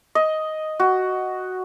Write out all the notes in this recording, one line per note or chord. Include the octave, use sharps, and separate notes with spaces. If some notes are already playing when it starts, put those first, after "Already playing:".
D#5
F#4